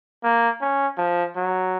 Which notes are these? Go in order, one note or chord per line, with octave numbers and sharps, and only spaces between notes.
A#3
C#4
F3
F#3